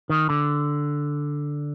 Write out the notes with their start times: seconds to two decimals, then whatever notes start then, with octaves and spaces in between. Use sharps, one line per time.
0.10 D#3
0.30 D3